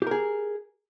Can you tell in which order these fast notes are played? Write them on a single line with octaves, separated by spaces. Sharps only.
G4 A#4 G#4